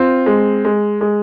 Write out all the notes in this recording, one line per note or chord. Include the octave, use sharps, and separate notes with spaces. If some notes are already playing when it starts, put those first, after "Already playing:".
Already playing: C4 F4
G#3
G#3
G#3